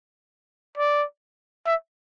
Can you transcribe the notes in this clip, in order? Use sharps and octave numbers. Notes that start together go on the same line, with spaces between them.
D5
E5